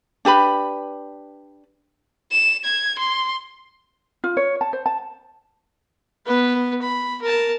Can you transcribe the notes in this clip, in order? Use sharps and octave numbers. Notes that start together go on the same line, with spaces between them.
D4 G4 B4 B5
E7
G#6
C6
F4
C#5
A5
C5
A5
B3 B4
B5
A#4 A5